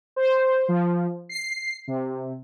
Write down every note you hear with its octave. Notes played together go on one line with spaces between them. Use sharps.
C5
F3
C7
C3